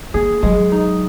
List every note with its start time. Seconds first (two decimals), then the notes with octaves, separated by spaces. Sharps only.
0.14 A#3 G#4
0.43 F#3 G#3
0.72 D#4